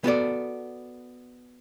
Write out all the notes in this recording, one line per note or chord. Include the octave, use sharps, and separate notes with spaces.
B3 F#4 A4 D5